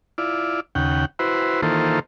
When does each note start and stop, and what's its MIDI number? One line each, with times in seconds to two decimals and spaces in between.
0.18 0.60 64
0.18 0.60 65
0.18 0.60 74
0.75 1.05 39
0.75 1.05 49
0.75 1.05 78
0.75 1.05 79
1.19 1.61 64
1.19 1.61 66
1.19 1.61 71
1.19 1.61 72
1.63 1.99 51
1.63 1.99 52
1.63 1.99 58
1.63 1.99 65
1.63 1.99 69
1.63 1.99 72